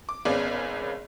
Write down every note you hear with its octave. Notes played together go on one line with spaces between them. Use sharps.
D6
G#1 B3 C#4 G#4 D5 F5